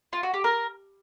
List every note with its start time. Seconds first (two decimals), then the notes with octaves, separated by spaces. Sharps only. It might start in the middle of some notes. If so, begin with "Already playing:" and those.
0.13 F4
0.23 F#4
0.34 G4
0.44 A#4